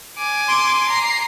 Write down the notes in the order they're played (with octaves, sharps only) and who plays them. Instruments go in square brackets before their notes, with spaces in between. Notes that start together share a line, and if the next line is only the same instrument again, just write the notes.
[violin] G#5 D6
[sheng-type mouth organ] C6
[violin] A#5 C7